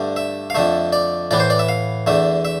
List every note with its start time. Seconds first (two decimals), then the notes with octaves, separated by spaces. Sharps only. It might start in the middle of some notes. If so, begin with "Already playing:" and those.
Already playing: G2 D3 A3
0.16 E5
0.50 F5
0.55 F2 D3 A3 E5
0.93 D5
1.31 A2 E3 B3 D5
1.40 C5
1.50 D5
1.59 E5
1.69 F5
2.07 E2 D3 A3 E5
2.45 E5